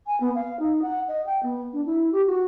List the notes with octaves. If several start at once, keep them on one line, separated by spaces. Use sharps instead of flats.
G#5
B3
F5
D#4
F#5
D#5
G5
B3
D4
E4
G4
F#4